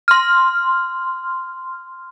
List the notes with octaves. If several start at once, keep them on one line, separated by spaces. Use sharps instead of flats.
C6 F6